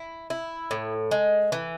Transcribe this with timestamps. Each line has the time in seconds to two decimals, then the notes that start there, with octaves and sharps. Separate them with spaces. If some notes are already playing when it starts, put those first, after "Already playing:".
Already playing: E4
0.30 E4
0.71 A2
1.11 G#3
1.52 E3